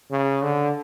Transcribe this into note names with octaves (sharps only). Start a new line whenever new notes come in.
C#3
D3